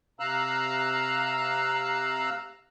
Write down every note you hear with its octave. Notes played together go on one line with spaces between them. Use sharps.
C3 F5 A#5 E6 F#6